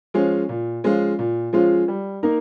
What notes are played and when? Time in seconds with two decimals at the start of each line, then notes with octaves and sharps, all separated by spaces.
0.14 F3 G#3 C#4 F4
0.49 A#2
0.84 F3 G#3 C#4 F4
1.19 A#2
1.53 F3 G#3 C#4 F4
1.88 G3
2.23 A#3 D#4 A#4